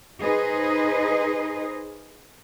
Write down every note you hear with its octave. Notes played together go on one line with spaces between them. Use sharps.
D#4 G#4 B4 C5 D#5